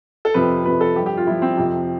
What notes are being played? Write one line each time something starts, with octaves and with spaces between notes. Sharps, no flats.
A4
F2 C3 F3 B4
F2 C3 F3 B4
A4
G2 F3 G4
G4
F4
G2 F3 E4
C4
F2 C3 F3